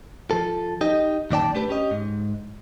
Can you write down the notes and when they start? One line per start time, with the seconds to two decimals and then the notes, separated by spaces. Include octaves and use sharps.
0.31 F3 A4
0.81 D#4 G4 D#5
1.31 F#2 A#2 D#3 D5 G5 A5
1.55 A3 D4 G4 B4
1.69 C#4 G4 D#5
1.91 G#2